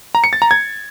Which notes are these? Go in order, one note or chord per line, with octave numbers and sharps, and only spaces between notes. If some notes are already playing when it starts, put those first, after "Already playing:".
A#5
C#7
A6
A#5
G#6